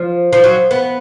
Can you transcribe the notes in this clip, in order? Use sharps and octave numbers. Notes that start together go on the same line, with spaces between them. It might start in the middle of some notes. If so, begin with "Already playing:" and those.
Already playing: F3
F3
F#3
B3